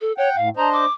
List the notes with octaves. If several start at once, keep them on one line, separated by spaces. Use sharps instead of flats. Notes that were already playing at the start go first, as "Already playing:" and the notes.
A4
C#5 F#5 G5
A2 F5
D4 C5 D#5 A#5
D6